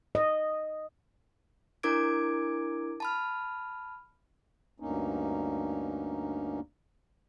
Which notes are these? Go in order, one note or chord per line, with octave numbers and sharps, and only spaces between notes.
D#5
D4 E4 A#4 D6 G#6 D7
A5 B5 F6
D2 G2 A#3 C#4 D#4